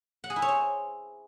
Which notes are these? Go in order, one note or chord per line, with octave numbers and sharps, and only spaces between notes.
F#5
G#4
E4
C#5
C5